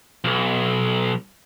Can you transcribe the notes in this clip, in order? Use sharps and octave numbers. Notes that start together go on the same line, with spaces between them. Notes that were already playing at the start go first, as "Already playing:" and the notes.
B1